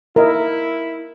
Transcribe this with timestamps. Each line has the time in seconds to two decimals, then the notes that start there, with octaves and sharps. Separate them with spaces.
0.16 E4 A#4 D#5 E5